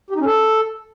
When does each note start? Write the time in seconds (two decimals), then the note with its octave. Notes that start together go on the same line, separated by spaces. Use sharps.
0.10 G4
0.15 D#4
0.20 C#4
0.25 A4